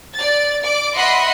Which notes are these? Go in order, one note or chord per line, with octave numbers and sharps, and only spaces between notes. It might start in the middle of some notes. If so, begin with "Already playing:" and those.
D5 A6
D5 D6
D#5 E5 F#5 B5 C6